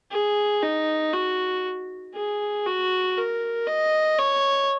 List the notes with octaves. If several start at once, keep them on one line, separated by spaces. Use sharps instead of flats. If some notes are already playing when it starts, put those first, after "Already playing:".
G#4
D#4
F#4
G#4
F#4
A#4
D#5
C#5